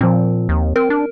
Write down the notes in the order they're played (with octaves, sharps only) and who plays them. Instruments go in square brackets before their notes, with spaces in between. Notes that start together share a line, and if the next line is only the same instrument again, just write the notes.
[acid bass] A#2 [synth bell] F3 C4
[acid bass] D#2
[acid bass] C4 [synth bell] A#4
[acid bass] D4